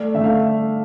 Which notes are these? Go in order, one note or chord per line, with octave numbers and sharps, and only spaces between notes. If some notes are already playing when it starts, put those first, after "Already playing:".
Already playing: A3 D5
D3 A3 E5
F5